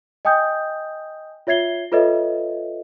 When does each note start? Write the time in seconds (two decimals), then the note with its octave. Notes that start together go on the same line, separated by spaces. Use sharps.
0.25 D#5 G5 G#5 D#6 G6
1.47 F4 C#5 E5 G#6 C7 G7
1.92 F4 A4 B4 C#5 D#5 E5